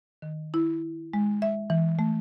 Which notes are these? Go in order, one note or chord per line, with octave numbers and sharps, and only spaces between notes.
D#3
E4
G#3
E5
E3
A3